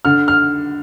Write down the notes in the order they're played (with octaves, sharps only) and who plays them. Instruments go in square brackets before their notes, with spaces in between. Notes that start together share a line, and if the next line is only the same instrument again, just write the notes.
[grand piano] D3 F6
F6